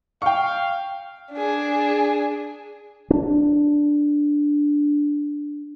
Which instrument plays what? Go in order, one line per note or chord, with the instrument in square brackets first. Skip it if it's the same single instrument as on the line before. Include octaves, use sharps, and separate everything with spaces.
[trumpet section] F5 [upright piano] G5 C#6
[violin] D4 G#4
[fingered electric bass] C#4 D4